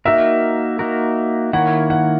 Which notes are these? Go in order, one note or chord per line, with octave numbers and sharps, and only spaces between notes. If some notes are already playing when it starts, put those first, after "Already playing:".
A#3 D#4 F#4 A#4 E5
A#3 D#4 F#4 A#4
D#3 A#3 E4 A#4 C#5 F#5
F#5